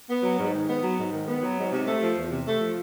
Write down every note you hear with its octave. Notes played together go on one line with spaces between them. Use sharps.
B3
F#3
G#2
D#3
B3
F#3
G#2
D#3
B3
F#3
G#2
C3
A3
F3
E2
C3
A3
F3